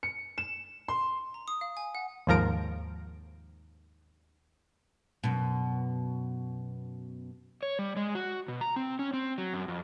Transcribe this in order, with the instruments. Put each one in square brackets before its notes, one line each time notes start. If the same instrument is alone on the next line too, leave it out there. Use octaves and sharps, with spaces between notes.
[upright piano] C#7
E7
C6
[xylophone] A#5
D#6
F5
G#5
F#5
[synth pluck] D#2 G#2 F3 A#4 A#5 D7
[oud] F#2 B2
[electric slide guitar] C#5
G3
G#3
F#4
B2
A#5
C4
C#4
C4
F#3
F#2
F2